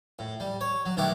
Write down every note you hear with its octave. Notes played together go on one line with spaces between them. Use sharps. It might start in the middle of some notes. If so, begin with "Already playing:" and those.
A2
G3
C#5
F#3
B1 D#3 A3 E4 G4 F#5